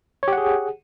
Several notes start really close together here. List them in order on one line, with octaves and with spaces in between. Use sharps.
C#5 G4 F#5 G#4